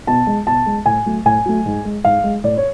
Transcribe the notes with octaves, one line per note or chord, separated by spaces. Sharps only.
B2 A5
G#3
B2 A5
G#3
A2 G#5
F#3 A3
A2 G#5
F#3 A3
G#2
G#3
G#2 F5
G#3
A2 D5
C#5